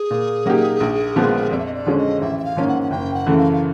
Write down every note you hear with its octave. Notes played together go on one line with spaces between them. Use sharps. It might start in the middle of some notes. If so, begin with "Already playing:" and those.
Already playing: G#4
A#2
F#3 A#3 D#4 G4
A#1
A#2 F3 G#3 B3
F2 D5
E5
D#5
D5
D3 F3 G#3 C#4
D#5
A1 E5
E5
F5
G#2 F3 A#3 C#4
F#5
F#5
F#1 G5
F#5
F#2 C#3 E3 A3
F5
F5